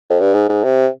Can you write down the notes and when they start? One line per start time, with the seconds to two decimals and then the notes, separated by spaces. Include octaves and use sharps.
0.10 F2
0.20 G2
0.34 G#2
0.49 G#2
0.64 C3